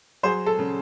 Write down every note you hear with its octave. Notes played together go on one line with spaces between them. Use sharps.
F#3 G#4 C5
A4
C#3